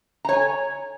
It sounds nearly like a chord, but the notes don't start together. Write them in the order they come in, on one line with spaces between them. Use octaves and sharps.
A#5 C#5 G#5